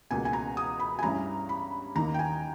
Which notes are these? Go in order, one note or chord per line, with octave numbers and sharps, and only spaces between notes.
C#2 B2 A#3 G#5
G#5
A#5
D#6
B5
G#5
G2 G3 C#4 E4 A#5
B5
D#2 D#3 A#3 D#4 A#5
G5
G#5